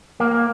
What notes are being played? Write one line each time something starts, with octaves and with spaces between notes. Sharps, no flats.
A#3